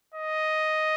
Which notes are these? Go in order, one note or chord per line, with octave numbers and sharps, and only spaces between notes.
D#5